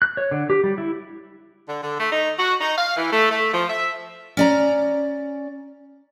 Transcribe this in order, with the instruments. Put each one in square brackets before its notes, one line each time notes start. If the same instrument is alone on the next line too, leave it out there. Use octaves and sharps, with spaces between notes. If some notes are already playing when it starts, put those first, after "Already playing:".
[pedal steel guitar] F#6
C#5
D3
G4
G3
E4
[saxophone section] D3
D3
A3
D#4
F#4
D#4
F5
E3
A3
A3
F3
E5
[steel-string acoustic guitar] C#4 D5 A#5